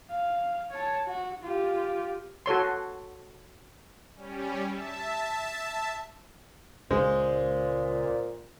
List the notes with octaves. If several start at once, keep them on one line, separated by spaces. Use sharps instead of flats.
F5
C#5 A5
F#4
F4 G4
F#4 A4 C#5 C6
G3 C#4
E5 A5
C#2 A#2 G#3 C#4 C5